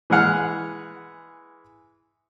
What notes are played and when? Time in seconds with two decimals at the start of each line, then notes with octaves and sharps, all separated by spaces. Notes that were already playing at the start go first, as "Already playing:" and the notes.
0.10 E3 G#3 G#4 F#5 F6